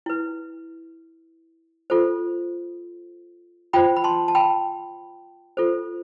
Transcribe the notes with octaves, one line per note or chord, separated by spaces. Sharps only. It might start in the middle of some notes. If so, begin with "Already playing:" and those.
E4 B4
F4 A4 C5
F4 C5 G5 B5
B5
A5 C6
A5
G5 B5
F4 A4 C5